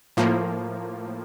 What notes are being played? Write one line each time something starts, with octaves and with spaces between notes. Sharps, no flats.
A2 F3 A#3